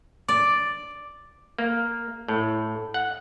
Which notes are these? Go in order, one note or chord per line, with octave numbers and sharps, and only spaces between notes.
D5 D6
A#3
A2
F#5